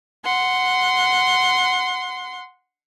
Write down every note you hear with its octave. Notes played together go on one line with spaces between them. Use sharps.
F#5 C6